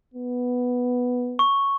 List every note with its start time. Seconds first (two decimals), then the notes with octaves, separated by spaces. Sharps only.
0.14 B3
1.39 C#6